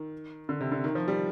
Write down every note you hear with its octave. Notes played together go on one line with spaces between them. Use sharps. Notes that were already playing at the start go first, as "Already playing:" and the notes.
Already playing: D#3
D3
C3
D3
D#3
F3
G3